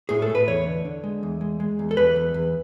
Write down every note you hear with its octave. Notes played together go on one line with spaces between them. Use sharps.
A2 G#4
A4
A2
B4
E2 C#5
D3
D3
G#3
E2
G#3
G#3
E2
A4
E2 B4
E2
E2